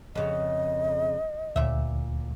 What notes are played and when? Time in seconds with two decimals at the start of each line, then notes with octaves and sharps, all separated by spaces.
0.15 F2 C#3 D#5
1.56 D2 A#2 E5